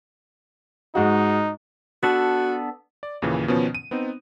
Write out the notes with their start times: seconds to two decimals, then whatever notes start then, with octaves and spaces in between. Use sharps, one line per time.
0.95 G#2 D#4 F#4
2.03 B3 D4 F#4 A4
3.03 D5
3.22 D#2 A#2 C#3 E3
3.48 B2 D#3 F3 B3 C#4
3.75 D#7
3.91 B3 C4 D#4